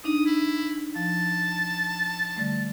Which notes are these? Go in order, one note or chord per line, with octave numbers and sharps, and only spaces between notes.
D4 D#4 D#6
E4
F3 A5
D3 G3 A3